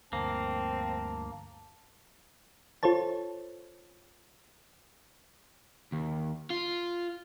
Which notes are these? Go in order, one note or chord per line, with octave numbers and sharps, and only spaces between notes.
D2 G2 A#3 C4 A5
F4 A4 C5 C#5 A5
D#2
F4